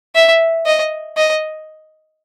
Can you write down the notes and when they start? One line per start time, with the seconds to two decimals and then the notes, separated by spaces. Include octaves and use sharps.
0.15 E5
0.66 D#5
1.17 D#5